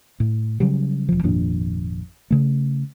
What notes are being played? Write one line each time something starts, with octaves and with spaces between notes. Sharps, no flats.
A2
C#3 F#3 G3
E1 F3
G#1 F2 A#2 D4
C#3 A3